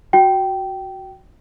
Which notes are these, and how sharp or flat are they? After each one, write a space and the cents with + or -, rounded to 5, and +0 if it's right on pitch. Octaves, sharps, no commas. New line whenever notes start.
F#4 +0 G5 -15